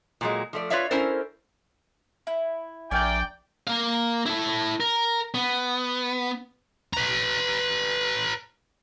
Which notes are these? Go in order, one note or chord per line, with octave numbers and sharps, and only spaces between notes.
A#2 F#3 G#3
F3 A3 D5
F4 B4 C#5 D5 E5 F5
C#4 E4 A4 A#4 C5
E4
A#1 A3 A#4 D5 G5 G#5
A#3 F5
E4 A4
A#4
B3
B4 A#5